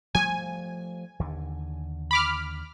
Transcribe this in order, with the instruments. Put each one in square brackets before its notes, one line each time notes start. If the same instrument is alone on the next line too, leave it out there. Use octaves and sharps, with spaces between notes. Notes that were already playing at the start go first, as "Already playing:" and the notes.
[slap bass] F3 G3 A3 [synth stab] G#5
[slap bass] D#2 D3
[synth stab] B5 D6 F6